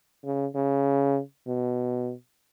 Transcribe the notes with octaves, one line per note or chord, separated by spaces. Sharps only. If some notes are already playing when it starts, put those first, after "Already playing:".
C#3
C#3
B2